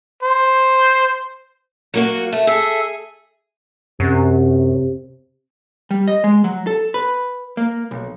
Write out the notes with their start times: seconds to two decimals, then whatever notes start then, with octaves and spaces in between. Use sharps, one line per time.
0.23 C5
1.94 F#3 A#3 F#4
2.33 A3
2.47 G#4 A4 E5
4.00 F#2 C3
5.91 G3
6.08 D#5
6.24 G#3
6.44 F#3
6.67 A4
6.94 B4
7.57 A#3
7.91 B1